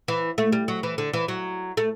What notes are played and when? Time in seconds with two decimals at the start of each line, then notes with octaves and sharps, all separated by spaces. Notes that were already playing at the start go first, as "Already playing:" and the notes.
0.08 E3
0.38 A3
0.52 G3
0.68 F#3
0.83 E3
0.98 D3
1.13 E3
1.28 F#3
1.77 A3